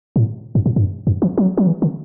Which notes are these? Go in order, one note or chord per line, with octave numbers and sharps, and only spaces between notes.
A2
G2
A2
G2
F#2
E3
F#3
F#3
E3
D3